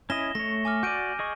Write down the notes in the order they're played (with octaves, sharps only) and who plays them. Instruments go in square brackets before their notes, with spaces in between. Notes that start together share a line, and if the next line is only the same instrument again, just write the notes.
[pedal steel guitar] C#4 E4 D#5 [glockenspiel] A#6 E7 G7
[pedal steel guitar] A3 C#5 [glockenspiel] A#6
[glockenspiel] G#5 D6 F6
[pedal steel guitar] F#4 D5 [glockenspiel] G6 D7 D#7
[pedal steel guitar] G#4 D#5 C#6